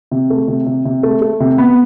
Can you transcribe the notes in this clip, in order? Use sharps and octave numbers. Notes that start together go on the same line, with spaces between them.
C3
A3
C3
C3
C3
A3
A3
C3
B3